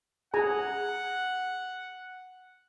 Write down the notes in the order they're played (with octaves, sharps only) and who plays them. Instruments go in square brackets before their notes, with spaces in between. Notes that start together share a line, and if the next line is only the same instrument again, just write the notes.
[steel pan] G#4 G#5 A#5 [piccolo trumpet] F#5